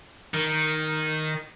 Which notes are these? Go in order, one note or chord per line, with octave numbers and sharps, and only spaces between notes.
D#3